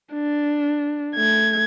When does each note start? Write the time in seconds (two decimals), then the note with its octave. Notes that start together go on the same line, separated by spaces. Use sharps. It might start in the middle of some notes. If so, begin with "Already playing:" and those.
0.14 D4
1.16 A3 G#6